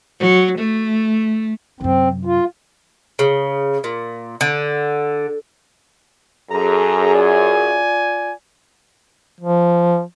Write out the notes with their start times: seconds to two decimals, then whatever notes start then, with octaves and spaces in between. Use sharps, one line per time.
0.20 F#3
0.59 A3
1.81 F#2 C3 C4
2.25 F4
3.19 C#3
3.84 A#2
4.41 D3
6.51 F#2 G#4 A4 A#5
7.14 F4 D5 G#5
9.40 F3